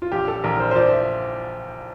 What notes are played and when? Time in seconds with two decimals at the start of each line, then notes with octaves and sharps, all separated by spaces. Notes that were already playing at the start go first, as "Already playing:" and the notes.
0.02 F4
0.12 A#1 G4
0.28 A4
0.44 A#1 A#4
0.60 C5
0.71 C5
0.76 F3 D5
0.92 E5